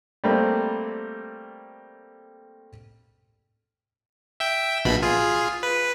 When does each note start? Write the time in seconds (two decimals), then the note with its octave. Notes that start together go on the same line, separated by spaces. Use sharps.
0.24 G3 A3 A#3 C4
4.40 E5 G5
4.85 A#1 B2 B5
5.03 F4 G#4
5.63 B4